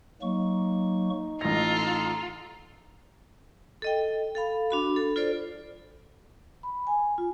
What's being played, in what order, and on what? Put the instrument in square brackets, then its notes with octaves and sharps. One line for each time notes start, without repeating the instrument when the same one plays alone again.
[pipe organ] F#3 A#3 C#6 [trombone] D#4
[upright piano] A1 A#6 [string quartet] F4 A4 [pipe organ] A#5
[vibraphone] A4 D#5 G5
A4 F5 B5
D4 F#4 B5
A4
F4 A4 C5 D5
B5
G#5
F4